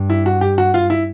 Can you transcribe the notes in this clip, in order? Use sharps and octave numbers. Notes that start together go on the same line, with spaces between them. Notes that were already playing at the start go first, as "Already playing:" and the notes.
Already playing: G2
E4
F#4
G4
F#4
F4
E4